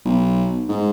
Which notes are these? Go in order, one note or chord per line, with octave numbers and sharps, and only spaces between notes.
B1
G#2